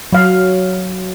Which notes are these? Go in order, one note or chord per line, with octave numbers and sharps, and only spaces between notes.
F#3 F5